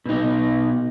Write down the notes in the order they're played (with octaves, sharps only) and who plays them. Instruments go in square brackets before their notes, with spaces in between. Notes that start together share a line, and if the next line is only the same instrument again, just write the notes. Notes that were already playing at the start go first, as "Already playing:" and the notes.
[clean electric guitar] B2 D#4